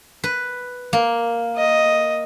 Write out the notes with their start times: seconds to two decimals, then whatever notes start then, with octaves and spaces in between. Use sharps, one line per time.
0.24 B4
0.93 A#3
1.56 D#5